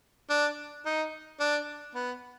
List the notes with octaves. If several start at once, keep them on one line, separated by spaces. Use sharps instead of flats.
D4
D#4
D4
B3